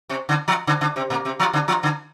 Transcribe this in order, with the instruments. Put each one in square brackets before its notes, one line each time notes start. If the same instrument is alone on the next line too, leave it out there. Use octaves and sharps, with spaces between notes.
[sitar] C3 C4
D3 D4
F3 F4
D3 D4
D3 D4
C3 C4
A#2 A#3
C3 C4
F3 F4
D3 D4
F3 F4
D3 D4